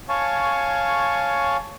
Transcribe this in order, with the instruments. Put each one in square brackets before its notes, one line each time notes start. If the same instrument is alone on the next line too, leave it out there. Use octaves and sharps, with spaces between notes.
[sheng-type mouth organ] C#5 F5 G#5 A5 C#6